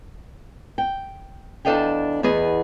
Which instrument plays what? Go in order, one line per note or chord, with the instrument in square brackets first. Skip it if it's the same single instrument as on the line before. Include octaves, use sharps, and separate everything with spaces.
[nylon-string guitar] G5
E2 D4 A4 D#5 F5 G5
E2 B3 G#4 D#5